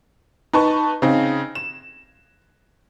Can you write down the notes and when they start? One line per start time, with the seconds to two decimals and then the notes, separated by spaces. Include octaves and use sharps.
0.53 D#4 B4 A5 C#6
1.02 C#3 C4 D#4
1.55 E7